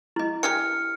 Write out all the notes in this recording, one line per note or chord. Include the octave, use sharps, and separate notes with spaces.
E4 D#5
G4 G#4 A#4 F6 C#7